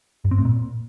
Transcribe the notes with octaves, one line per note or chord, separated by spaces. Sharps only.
G2
C4
A2
A#2